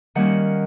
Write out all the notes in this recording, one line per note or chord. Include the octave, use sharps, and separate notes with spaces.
D#3 G3 A#3 C#4 F#5